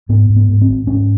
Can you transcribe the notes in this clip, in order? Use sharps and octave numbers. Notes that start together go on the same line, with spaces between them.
G#2 B3
G#2
B3
G#2
C4
G#1
G#2 C#4